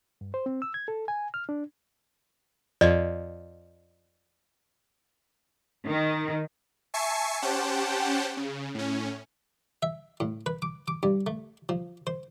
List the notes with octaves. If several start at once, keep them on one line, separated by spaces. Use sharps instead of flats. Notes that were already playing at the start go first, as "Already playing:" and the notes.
G2
C5
C4
E6
G#6
A4
G#5
F6
D4
F2 D5 D#5
D#3
E5 G#5 A5 C#6 C7 C#7
C#4 G4 C5 F#5 G5 A5
C#3
A2 C#4
E5
A2
B4
D6
D6
G2
A3
F3
C5